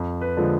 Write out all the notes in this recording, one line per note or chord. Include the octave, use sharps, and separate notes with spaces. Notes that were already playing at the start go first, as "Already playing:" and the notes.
Already playing: F2
B4
D3 F3 G#3